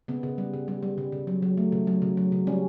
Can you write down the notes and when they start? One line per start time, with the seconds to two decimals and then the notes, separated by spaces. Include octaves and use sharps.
0.08 C#3 B3
0.23 C#3
0.38 G3
0.53 C#3
0.68 G3
0.83 G3
0.98 C#3
1.12 C#3
1.27 F#3
1.42 F#3
1.57 A3
1.72 C#3
1.87 F#3
2.02 C#3
2.17 F#3
2.32 C#3
2.47 G3 C#4